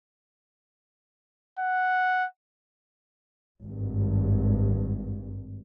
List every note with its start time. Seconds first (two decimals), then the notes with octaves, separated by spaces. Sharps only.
1.59 F#5
3.62 G#1 G2